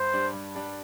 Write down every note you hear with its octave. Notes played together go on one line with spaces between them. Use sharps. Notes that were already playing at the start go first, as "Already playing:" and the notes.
Already playing: G2 C5
G3 D4
G2
G3 D4